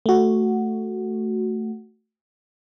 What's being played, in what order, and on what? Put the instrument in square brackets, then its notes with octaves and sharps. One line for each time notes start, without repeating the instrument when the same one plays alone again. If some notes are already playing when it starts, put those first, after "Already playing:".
[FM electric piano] A3 F#4